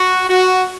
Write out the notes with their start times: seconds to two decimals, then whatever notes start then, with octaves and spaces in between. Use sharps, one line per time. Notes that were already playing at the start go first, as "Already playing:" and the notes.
Already playing: F#4
0.30 F#4